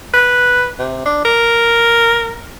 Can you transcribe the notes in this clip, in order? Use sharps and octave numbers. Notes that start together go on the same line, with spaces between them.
B4
C3
D4
A#4